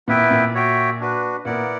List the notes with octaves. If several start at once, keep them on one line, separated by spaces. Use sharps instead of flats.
A#2 A#3 B3 E4 B4 E5 G5
A#2 A#3
F#4 C#5 E5 G5
D4 F#4 B4
A#2 A#3 B3 E4 A#4 D5 F#5